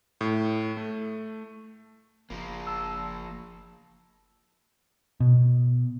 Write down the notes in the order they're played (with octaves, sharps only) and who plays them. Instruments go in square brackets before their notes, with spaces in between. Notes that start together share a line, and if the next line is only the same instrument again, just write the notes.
[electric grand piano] A2
A3
[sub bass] F#1 [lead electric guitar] F3 A#3
[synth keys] A5 E6
[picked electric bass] B2